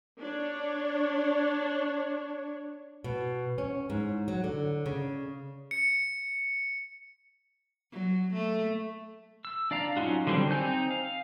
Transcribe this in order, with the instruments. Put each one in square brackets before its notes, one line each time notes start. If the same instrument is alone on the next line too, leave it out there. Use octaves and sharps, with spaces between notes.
[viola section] D4 C#5
[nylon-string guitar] B2
C#4
G#2
F#3
D3
C#3
[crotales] C#7
[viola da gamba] F#3
A3
[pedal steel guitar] E6
D4 D5 F5 A#5
F#3 C#4 D#4 F4 F#4
D3 D#3 F#3 G3 C4
C4 D#4 G#5 G6
F5